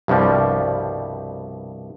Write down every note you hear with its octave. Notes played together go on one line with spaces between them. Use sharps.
C2 G2 B2 F3 G3